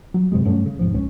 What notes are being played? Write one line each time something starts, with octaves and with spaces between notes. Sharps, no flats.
F#3
F#2 C3 G3 G#3
G2 F#3 A3 C#4
C#3
E1 C#2 G#2 F3
C#2 C#4